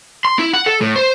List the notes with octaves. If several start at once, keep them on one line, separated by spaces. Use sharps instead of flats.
C6
E4
F#5
A4
A2
C5